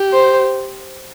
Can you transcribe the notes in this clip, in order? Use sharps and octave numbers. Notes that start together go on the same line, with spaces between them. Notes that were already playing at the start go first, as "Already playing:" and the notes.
Already playing: G4
C5